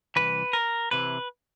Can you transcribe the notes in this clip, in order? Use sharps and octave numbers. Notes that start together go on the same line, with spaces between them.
C2 C3 E3 B4
A#4
C3 E3 B4